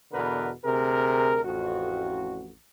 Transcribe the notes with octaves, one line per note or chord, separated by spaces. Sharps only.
E2 B2 D3 B3 A#4 B4
D2 C3 G#4 A#4
A1 F2 F#4